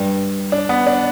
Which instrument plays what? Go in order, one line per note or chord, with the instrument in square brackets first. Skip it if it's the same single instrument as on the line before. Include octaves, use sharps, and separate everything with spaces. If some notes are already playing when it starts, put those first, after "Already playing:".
Already playing: [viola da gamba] G2
[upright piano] D4
B3
D4